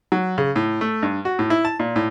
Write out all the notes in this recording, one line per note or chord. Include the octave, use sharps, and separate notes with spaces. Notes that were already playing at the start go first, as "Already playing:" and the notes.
F#3
C#3
A2
A3
G2
F#4
A2
E4
A5
A#2
A2